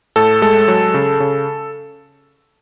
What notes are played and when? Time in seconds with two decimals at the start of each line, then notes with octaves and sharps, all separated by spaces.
0.16 A2 A4
0.42 G#3 A4
0.68 F#3
0.94 C#3
1.20 C#3